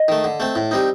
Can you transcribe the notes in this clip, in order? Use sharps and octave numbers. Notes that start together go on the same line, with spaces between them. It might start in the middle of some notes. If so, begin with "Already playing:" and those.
Already playing: D#5
D#3 A3
D3
A3 C4
A2
G3 C4 D#4